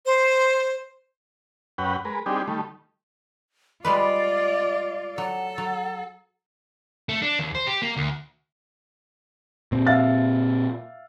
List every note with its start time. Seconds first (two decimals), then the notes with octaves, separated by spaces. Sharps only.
0.06 C5
1.78 F#2 C#4 B4 F#5 G5
2.05 G#3 A#4 B4
2.26 G3 C4 D4 D#4 G4 G#4
2.48 D#3 G3 A3
3.85 G3 G#3 F4 B4 D5 D#5
5.18 F#3 A4 F#5
5.58 F#3
7.09 A3
7.22 D4
7.39 D#2
7.55 C5
7.67 G4
7.82 A#3
7.97 D2
9.72 A#2 C4
9.87 E5 F5 A6